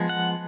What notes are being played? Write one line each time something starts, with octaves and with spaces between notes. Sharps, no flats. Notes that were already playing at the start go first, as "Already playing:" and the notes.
Already playing: F3 G#3 B3
F#5